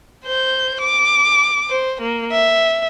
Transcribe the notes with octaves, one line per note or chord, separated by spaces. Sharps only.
C5 G6
D6
C5
A#3
E5